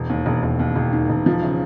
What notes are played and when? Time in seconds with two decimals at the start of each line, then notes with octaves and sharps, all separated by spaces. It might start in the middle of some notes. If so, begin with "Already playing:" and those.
Already playing: E1
0.10 D#2
0.26 E1
0.43 E1
0.59 D#2
0.76 E1
0.93 D#3
1.09 E1
1.26 F3
1.42 C#3